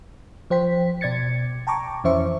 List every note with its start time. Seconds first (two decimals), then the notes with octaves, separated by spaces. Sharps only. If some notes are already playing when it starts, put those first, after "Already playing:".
0.50 F3 C5 G5 B6
1.01 B2 D5 G#6 A6 C#7
1.67 G5 A5 A#5 C#6 D6
2.04 F2 E3 C#4 C5 E5 C#6